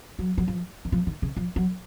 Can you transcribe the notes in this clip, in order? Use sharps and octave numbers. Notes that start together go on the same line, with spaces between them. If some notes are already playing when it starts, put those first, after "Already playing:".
F#3
F#3
F3
D#3
F3
D#3
C#3
F3
F#3